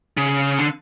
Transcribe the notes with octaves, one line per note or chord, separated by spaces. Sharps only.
C#3
D3